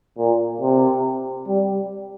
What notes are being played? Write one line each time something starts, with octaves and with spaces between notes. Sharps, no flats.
A#2
C3
G3